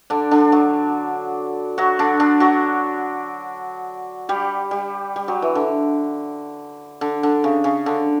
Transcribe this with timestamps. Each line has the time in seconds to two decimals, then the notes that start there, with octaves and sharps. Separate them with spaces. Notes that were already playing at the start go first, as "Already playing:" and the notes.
0.10 D3 D4
0.31 D3 D4
0.52 F#3 F#4
1.78 F#3 F#4
1.99 D3 D4
2.20 D3 D4
2.40 F#3 F#4
4.29 G3 G4
4.71 G3
5.16 G3
5.28 F#3
5.42 E3
5.55 D3
7.01 D3
7.23 D3
7.44 C#3
7.64 C#3
7.86 D3